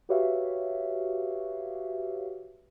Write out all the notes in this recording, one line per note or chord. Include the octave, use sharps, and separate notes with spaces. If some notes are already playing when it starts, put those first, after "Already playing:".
F#4 G4 B4 C#5 E5 F5